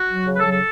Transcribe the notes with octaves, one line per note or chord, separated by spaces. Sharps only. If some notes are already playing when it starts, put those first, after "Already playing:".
Already playing: F#4
F#3
C#3
B4
A4
F#3
A4